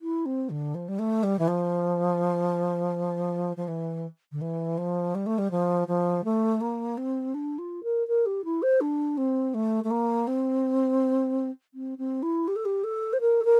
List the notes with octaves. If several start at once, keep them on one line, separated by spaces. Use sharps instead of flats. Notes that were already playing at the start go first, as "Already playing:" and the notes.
E4
C4
D3
F3
G3
A3
G3
E3
F3
F3
E3
D3
E3
F3
G3
A3
G3
F3
F3
A3
A#3
C4
D4
F4
A#4
A#4
G4
E4
C5
D4
C4
A3
A3
A#3
C4
C4
C4
E4
G4
A4
G4
A4
C5
A#4
A4
A#4